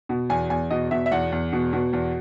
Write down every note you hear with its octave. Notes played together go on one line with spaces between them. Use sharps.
B2
E2 G#5
E2 G#5
B2 D#5
B2 E5
E5
E2 F#5
E2
B2
B2
E2